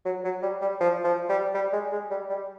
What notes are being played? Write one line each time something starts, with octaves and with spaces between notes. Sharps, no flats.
F#3
F#3
G3
G3
F3
F3
G3
G3
G#3
G#3
G3
G3